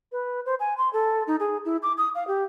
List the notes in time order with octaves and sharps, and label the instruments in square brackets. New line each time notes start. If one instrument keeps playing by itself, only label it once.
[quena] B4
C5
G#5
C6
A4
D#4
G#4
E4
D6
D#6
F5
G4